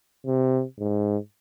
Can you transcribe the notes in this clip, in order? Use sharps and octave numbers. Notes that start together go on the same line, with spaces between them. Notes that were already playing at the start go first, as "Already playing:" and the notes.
C3
G#2